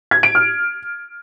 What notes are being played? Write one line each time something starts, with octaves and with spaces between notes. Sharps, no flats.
G#6
D7
F6